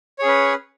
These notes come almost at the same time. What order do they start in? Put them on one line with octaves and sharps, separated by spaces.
C#5 G#4 C#4 B4